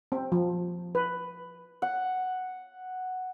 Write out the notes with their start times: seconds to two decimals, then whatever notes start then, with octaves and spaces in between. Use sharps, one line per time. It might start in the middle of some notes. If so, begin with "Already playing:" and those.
0.12 C4
0.32 F3
0.95 B4
1.82 F#5